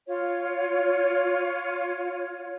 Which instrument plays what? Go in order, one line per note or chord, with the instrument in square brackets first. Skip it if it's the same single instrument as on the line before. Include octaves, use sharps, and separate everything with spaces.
[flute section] F4 C#5